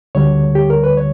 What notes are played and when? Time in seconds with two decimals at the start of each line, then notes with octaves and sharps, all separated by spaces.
0.15 D2 D3 G3 C#5
0.55 G4
0.70 A#4
0.84 B4
0.97 C#5